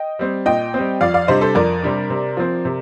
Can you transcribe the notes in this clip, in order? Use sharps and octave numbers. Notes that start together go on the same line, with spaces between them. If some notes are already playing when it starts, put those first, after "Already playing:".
Already playing: D#5 G5
G3 C4
A#2 D#5 G5
G3 C4
F2 D5 F5
D5 F5
C3 G3 D4 C5 D#5
A4 C5
F2 A#4 D5
C3 G3 D4
C3
F3 C4
C3